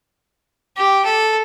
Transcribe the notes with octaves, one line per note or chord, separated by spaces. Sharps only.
G4
A4